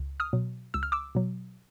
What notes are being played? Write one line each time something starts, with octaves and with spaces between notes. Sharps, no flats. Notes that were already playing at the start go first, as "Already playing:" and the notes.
Already playing: C#2
D#6 F6
B2 F#3
C#2 E6
F6
D6 E6
B2 F#3